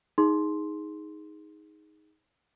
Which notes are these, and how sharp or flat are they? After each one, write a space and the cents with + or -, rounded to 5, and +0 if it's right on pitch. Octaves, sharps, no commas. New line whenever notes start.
D#4 +15 G#4 +0 C6 +0